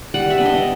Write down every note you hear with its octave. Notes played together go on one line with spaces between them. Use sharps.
G3 F#5
E5
B3 D4
D#5